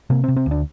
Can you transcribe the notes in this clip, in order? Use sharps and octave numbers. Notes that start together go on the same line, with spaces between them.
C3 A#3
C4
C3
C4
D2
D4